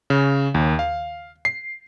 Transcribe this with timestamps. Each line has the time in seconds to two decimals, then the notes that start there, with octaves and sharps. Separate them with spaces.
0.10 C#3
0.54 D#2
0.79 F5
1.45 C7